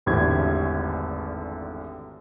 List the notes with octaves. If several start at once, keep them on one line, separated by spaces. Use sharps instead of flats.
G#1 E2 A2 D3 G4 G#6